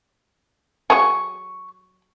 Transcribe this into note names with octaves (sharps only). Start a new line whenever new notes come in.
F#3 G#4 C#6